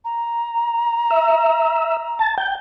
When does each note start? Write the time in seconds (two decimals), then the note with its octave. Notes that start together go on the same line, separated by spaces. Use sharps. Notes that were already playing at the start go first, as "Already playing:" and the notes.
0.05 A#5
1.11 E5
2.19 A5
2.38 G5